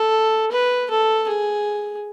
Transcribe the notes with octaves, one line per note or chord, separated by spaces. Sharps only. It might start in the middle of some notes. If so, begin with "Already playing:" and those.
Already playing: A4
B4
A4
G#4